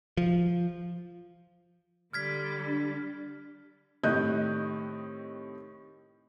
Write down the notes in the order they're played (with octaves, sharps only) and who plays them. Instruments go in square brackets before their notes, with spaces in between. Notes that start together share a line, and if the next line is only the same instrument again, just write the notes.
[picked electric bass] F3
[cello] D3 G3 [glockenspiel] F6 G#6 B6
[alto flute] D4
[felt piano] A2 C3 D#3 D#5 F#6 G6